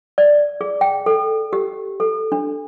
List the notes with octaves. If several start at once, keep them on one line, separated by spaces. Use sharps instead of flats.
D5
G#4
G5
A4
G4
A4
D4